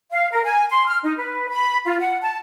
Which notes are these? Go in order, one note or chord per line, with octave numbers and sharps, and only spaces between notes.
F5
A#4
G#5
C6
F6
D#4
B4
B5
F4
F#5
A5